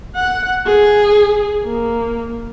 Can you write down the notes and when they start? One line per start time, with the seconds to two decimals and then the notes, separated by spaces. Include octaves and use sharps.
0.16 F#5
0.66 G#4
1.64 A#3